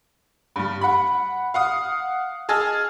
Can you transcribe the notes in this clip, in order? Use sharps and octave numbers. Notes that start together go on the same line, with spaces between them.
G2 G3
F#5 B5
F5 F#5 D#6
G#4 D#5 G#5 A5 E6 F6